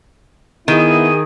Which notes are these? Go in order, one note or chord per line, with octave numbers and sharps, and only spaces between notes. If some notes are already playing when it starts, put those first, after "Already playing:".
D#3 B3 E4 G#4 D#7